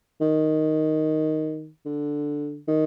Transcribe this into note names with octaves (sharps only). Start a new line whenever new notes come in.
D#3
D3
D#3